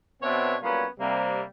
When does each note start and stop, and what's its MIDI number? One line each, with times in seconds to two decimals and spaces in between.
0.23 0.55 47
0.23 0.55 59
0.23 0.55 60
0.23 0.55 62
0.23 0.55 73
0.23 0.55 76
0.62 0.85 54
0.62 0.85 55
0.62 0.85 58
0.62 0.85 59
0.62 0.85 61
0.62 0.85 65
0.99 1.41 48
0.99 1.41 55
0.99 1.41 58